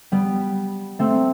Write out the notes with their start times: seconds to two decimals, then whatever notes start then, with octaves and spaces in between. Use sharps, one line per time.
0.12 G3 B3
0.99 A3 C4